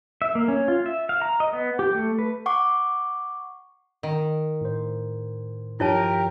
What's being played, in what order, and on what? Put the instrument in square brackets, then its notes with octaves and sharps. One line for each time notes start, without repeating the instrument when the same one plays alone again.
[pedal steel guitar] E5
A#3
C#4
F4
E5
F5
A#5
D#5
B3
G4
A3
B4
[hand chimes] F#5 C#6 D6
[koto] D#3
[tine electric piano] A2 C5
[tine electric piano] G2 F3 [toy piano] E4 C#5 A5 [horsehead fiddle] G4 A#4